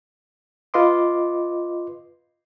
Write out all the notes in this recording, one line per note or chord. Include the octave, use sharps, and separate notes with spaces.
F4 B4 D#5 C6 D6